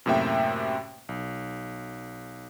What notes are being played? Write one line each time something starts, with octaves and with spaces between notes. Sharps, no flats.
F#2 A2 C3 A#3 E5 G5
B1